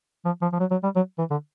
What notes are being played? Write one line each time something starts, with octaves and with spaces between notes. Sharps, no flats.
F3
F3
F3
F#3
F#3
G3
F#3
E3
D3